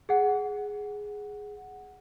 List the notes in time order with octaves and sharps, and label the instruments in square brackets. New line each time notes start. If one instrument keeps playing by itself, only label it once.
[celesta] G#4 F#5